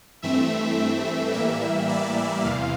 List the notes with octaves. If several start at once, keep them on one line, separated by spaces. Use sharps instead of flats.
G2 E3 A3 C4 E5
E5
A2 E3 G3 A#3 E5
D5
E2 C3 E3 F5